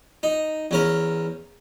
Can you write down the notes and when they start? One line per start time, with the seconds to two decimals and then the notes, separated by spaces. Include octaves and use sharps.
0.23 D#4
0.71 E2 C#4 A#4